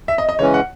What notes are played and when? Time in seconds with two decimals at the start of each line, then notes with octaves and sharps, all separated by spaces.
0.08 E5
0.18 D#5
0.29 D#5
0.39 C#3 E3 G#3 C#4 C#5
0.54 F#5